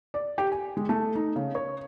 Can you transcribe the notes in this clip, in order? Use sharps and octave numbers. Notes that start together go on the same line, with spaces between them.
D5
G4
G#5
G#3
A3
D#4
C#3
C#5